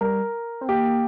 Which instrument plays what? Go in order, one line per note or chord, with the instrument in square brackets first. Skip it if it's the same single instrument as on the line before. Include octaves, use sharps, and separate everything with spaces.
[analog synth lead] G3 [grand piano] A#4
[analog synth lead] C4
[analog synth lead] A#3 [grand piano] G4